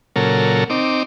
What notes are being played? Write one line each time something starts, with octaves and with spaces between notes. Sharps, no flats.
A#2 C#3 F#3 A4 A#4
C4 D#4 D6